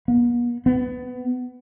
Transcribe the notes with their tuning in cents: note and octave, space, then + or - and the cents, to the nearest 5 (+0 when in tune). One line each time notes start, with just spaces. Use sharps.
B3 -45
B3 +20